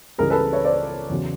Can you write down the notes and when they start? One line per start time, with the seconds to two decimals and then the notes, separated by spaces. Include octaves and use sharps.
0.18 C#2 C#3 E3 G3 G#4 A#4
0.30 A4 B4
0.52 B4 C#5
0.65 C5 D5
1.10 E2 C#3 F#3